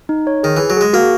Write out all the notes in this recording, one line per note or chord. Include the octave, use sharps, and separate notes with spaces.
D#4
C#5
D#3 G#4
E3 G#4
F#3
G#3 G#4
A#3 F#4